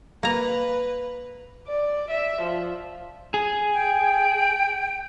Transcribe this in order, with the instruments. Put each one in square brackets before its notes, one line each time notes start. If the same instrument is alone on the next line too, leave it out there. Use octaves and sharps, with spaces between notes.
[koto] A#3 A#5 [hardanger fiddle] B4
[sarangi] D5
E5
F3
[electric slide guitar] G#4
[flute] G5